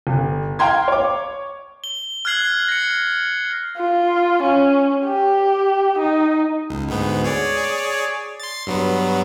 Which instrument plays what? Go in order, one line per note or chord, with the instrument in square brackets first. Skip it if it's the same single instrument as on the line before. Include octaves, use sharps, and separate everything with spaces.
[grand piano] G1
F5 G5 A#5 C6 G#6
C#5 D6
[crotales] G7
F6 F#6 G#6 C7 F#7
A#6 C#7
[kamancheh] F4
C#4
G4
D#4
[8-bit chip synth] C#2
D2 G#2 B3
G#4 C#5 D5
C6 A6
G2 F#3 B3